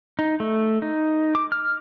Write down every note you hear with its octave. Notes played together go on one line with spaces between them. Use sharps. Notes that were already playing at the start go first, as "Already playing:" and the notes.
D#4
A3
D#4
D6
F6